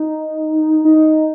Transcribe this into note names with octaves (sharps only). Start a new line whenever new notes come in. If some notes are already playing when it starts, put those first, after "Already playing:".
Already playing: D#4
D#4